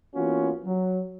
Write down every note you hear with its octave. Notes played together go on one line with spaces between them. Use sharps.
E3 A#3 B3 C#4 F4 F#4
F#3